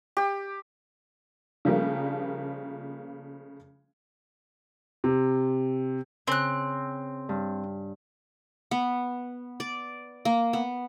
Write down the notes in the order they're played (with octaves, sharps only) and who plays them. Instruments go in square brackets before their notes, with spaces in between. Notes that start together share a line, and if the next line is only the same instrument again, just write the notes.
[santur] G4
[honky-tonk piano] C#3 F3 G3 A3 A#3 D4
[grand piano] C3
[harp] C#3 [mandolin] C4 F#6
[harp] G2
[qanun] B3
D5
A#3
B3